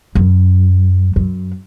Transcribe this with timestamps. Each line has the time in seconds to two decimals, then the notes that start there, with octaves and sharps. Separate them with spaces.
0.15 F#2
1.16 F#2